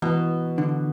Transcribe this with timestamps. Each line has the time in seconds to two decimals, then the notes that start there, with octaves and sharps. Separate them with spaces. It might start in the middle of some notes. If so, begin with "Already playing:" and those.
0.02 B2 E3
0.58 D3